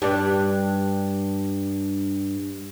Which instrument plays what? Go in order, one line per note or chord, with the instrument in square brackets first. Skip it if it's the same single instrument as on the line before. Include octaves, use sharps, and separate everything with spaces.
[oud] G2 D4